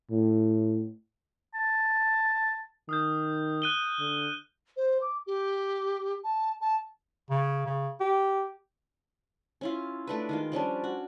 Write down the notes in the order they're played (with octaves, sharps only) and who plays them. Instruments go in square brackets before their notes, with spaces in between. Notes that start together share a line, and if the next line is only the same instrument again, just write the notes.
[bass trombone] A2
[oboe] A5
[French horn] D#3 [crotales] D#6 F6 G6
[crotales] F#6 D#7 G7
[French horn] D3
[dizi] C5
D6
G4
A5
A5
[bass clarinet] C#3
C#3
G4
[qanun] C#4 E4 F4
A3 D4 B4
D#3 G#3 F4
F3 G3 C#4 D4
F#4